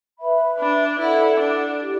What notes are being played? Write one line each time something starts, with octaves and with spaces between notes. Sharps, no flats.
B4 E5 B5
D4
E4 A4 D5 F#5
D4
E4 G4 D5